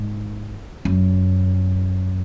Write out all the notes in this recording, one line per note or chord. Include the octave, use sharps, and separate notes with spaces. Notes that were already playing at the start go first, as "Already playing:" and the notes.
Already playing: G#2
F#2